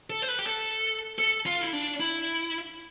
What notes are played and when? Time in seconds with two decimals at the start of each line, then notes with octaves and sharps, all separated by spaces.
0.10 A4
0.22 C5
0.28 B4
0.39 G4
0.46 A4
1.19 A4
1.46 F4
1.61 E4
1.73 D4
2.00 E4